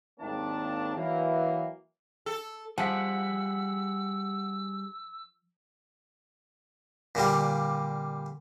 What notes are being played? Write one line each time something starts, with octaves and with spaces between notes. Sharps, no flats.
G#1 D#2 D#3 A#3 D4 A5
E3 F#3 A#3
A4
F3 G3 G#4 F#5 E6 B6
A#2 D3 G3 F4